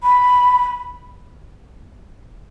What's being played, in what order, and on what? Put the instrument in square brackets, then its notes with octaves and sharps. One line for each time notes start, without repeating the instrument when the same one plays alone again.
[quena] B5